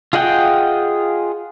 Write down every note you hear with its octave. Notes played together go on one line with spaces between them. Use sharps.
F4 G#4 D#5 F#5 G5